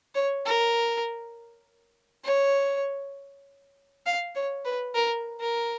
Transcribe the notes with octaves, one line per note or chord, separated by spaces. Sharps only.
C#5
A#4
C#5
F5
C#5
B4
A#4
A#4